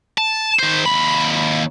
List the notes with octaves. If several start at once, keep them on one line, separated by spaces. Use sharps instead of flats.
A5
D#3 C5
D#2 B5